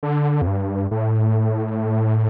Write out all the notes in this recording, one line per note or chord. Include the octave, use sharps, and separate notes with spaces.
D3
F2
G2
A2